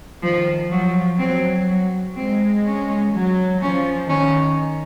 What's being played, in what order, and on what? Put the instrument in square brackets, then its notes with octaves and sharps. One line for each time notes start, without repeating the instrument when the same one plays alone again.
[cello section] D#3 [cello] F3
[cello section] F3 [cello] F#3
[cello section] F#3 [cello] C4
[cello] F#3
[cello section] G#3 [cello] C4
[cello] C#4
[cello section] F#3
[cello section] F3 [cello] C#4
[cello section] D#3 [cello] C#4